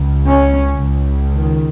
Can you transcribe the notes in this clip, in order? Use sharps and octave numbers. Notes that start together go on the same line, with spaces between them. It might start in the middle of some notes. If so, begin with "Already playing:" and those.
Already playing: C#2 C#3
C#4
C#2 C#3
D#3